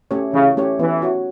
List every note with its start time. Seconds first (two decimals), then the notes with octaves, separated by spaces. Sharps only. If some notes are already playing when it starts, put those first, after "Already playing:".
0.11 A3 C#4 G4 C#5
0.33 C#3 E3
0.57 A3 C#4 G4 C#5
0.79 E3 B3
1.02 F#4 C#5